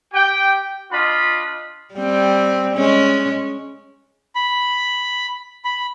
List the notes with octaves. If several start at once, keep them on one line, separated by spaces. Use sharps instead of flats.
G4 G5
D4 F4 D#5 B5
G3 C4
G#3 C#4
B5
B5